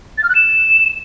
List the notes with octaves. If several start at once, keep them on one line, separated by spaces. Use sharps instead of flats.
A6
F6
F#6
E7